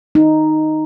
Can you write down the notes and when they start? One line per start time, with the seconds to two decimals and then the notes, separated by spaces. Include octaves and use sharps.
0.15 D#4